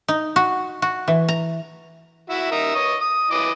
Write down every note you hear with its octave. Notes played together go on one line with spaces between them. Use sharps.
D#4
F#4
F#4
E3
A#5
E4 F#4 E5
D#4 A#4 E5
C#5 D#5
D#6
E3 D#5 D6